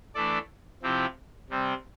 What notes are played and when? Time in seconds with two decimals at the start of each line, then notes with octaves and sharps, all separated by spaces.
0.15 E3 A3 D4 A4 D5
0.82 C3 F3 C4 E4 G4
1.50 C3 G3 C4